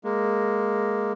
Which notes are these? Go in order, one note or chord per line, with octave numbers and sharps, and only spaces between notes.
G#3 A#3